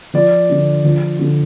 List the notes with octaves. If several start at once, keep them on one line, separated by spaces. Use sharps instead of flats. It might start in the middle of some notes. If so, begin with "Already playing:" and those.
F3 D5
D3
F3
D3